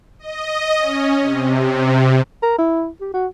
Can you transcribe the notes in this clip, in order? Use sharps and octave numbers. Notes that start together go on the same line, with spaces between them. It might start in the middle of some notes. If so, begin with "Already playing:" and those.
D#5
C#4
C3
A#4
E4
G4
F#4